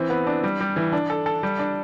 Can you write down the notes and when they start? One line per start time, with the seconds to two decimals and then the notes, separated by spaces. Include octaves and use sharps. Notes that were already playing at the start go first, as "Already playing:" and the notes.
Already playing: E3 C4
0.10 B3
0.27 D4
0.44 G3
0.61 G3
0.76 E3
0.93 D4
1.10 A4
1.26 A4
1.43 G3
1.59 D4